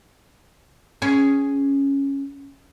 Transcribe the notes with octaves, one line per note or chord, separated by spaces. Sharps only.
C#4 G#4